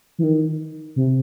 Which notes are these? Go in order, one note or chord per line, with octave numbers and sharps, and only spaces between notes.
E3
D#3
C3